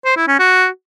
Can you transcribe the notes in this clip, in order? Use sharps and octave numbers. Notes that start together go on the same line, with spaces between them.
C5
E4
C#4
F#4